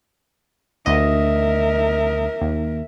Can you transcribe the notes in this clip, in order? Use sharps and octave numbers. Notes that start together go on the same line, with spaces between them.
D2 A#4 D#5 E5
D#2